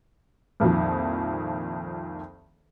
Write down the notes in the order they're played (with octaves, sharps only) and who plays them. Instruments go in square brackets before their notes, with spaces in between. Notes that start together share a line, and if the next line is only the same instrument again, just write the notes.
[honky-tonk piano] C2 F2 A#2 D#3 F3